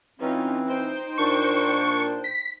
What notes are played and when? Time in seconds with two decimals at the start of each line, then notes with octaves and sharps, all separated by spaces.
0.20 E3 C4 C#4 D#4 F4
0.67 D#4 C5 G5
1.18 A#2 D4 C#6
2.24 B6